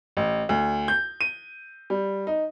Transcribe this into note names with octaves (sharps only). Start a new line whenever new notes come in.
A1
D2
G6
D#7
G3
D#4